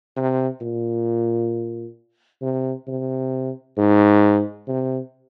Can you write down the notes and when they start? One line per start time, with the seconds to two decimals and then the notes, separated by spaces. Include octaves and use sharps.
0.16 C3
0.61 A#2
2.42 C3
2.88 C3
3.78 G#2
4.68 C3